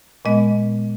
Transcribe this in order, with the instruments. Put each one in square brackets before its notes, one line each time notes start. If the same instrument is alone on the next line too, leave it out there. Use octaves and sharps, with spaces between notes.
[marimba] A#2 G#3 B3 D#5